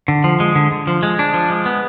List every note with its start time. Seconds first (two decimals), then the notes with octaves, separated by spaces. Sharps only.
0.08 D3
0.24 F3
0.40 G#3
0.55 D3
0.71 D3
0.87 F3
1.03 G#3
1.19 D4
1.34 F3
1.50 G#3
1.66 B3